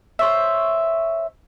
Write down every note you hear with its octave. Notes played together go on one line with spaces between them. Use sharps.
C5 C#5 E5